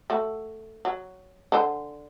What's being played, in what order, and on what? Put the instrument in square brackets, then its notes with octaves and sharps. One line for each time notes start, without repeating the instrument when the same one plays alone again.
[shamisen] A3 F#4
F#3
D3 C5 G#5